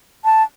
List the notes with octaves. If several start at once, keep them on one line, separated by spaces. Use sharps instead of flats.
A5